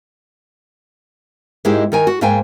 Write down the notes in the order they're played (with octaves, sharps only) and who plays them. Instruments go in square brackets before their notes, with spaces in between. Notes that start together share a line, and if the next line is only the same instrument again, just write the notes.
[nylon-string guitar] G#2 G#3 A#3 D#4 E4 G4
D#3 A#4 G#5
F#4
G#2 A#3 C5 F5 G5 G#5